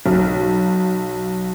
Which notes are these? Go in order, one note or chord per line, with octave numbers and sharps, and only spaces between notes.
B1